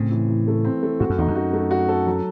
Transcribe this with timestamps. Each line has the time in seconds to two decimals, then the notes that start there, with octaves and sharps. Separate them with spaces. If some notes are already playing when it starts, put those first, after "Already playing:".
Already playing: A2 C#3 C4
0.11 E3
0.29 E3
0.47 A3
0.64 C4
0.83 A3
1.00 G#2 F#4
1.10 F#2
1.18 E2 D#4
1.28 F#2
1.35 F#4
1.53 A3
1.71 F#4
1.89 A4
2.07 F#3